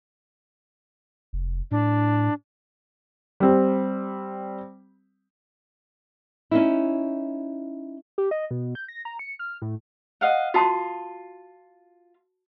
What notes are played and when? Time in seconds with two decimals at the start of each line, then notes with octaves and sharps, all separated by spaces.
1.33 F1
1.71 A2 D4
3.40 G3 C4
6.51 C#4 D#4 E4
8.18 G4
8.31 D#5
8.51 B2
8.75 G6
8.88 A#6
9.05 A#5
9.19 C#7
9.39 F6
9.62 A2
10.21 D#5 F5 F#5
10.54 F4 F#4 A5 C6 D#6